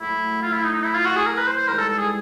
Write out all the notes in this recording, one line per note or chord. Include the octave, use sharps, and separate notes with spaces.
A2 F#3 A3 E4
F4
E4
D#4
D#4
E4
F4
F#4
G#4
A#4
B4
C5
C5
G#2 E3 G3 A#4
A4
A4
G#4